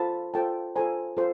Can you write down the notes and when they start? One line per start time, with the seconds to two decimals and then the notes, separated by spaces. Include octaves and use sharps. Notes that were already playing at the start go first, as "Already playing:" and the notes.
Already playing: F4 A4 C5 A5 B5
0.34 F4 A4 C5 G5 A5
0.75 F4 A4 C5 G#5 A#5
1.17 F4 A4 C5